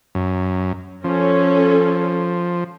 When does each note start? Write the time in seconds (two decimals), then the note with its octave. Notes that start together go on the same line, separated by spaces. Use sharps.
0.15 F#2
1.04 F3 C#4 A4